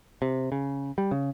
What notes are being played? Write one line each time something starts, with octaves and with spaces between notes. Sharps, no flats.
C3
C#3
G3
C#3